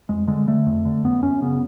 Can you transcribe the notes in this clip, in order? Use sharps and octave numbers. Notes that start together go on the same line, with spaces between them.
F2 G#3
D3 G#3
D3 A3
F2
D3
F#2 B3
F#2 C#4
C#3 B3